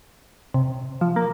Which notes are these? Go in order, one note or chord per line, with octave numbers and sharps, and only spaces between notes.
C3
F3
A#3